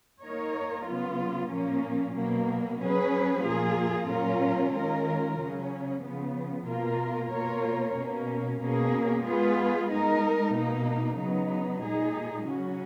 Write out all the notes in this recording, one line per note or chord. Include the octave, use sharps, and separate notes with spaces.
A#3 D#4 A#4 C#5
C#3 F#3 B3 F4
A#2 F3 A#3 C#4
B2 F#3 A#3
F#3 C#4 G#4 B4
A#2 F3 A#3 F4 G#4
A#2 F#3 C#4 F4 A#4
D#3 G#3 C#4 F4 A#4
C#3 F#3 C#4
C#3 F3 B3
B2 A#3 F4 A#4
B2 A#3 F4 A#4 C#5
B2 A#3 C#4
B2 A#3 C#4 G#4
G#3 B3 F4 G#4 B4
G#3 D#4 A#4
B2 A#3 D#4
C#3 F#3 B3 D#4
A#2 G#3 D#4 G#4
C#3 F#3 C#4 F#4